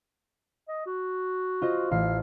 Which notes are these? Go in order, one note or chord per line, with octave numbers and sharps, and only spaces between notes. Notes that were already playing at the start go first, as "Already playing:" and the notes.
D#5
F#4
F4 C5 D#5
A1 F5